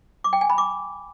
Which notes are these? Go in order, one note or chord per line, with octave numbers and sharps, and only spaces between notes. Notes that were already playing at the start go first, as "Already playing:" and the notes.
D6
G5
G#5
B5
D6